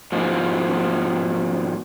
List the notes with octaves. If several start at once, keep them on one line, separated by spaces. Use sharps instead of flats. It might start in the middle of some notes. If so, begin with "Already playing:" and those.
G#2 B2 F3